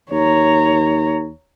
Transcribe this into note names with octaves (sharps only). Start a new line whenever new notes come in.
D#2 C#5 A#5